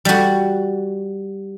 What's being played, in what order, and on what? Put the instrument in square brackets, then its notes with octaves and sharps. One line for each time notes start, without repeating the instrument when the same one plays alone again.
[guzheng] G3 F#4